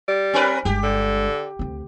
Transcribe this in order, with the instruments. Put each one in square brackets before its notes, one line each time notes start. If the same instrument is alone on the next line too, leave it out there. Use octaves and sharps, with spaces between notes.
[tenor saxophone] G3
[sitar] C4 A#4 B4
[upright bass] G1 G#3 [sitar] G4
[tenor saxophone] D3
[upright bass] D2 C4